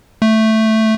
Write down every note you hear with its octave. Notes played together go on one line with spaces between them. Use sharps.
A3